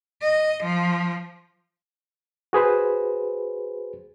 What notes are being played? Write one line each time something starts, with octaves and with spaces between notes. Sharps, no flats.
D#5
F3
F#4 G#4 B4 C5